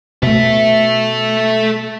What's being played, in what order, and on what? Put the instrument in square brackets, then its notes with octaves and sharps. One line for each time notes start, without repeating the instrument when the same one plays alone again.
[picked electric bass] B2 A3 [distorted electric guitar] A4 E5